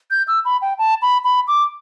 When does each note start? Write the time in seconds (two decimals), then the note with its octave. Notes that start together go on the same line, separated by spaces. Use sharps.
0.11 G6
0.28 E6
0.45 B5
0.62 G5
0.79 A5
1.02 B5
1.24 B5
1.48 D6